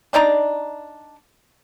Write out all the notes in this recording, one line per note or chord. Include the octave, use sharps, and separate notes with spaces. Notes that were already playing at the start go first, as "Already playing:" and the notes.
D4 D#4 D5 A#5